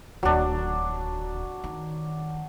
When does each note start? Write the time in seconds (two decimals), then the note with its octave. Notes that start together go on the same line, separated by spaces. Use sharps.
0.23 D1 D#2 F#3 D4
1.64 D#3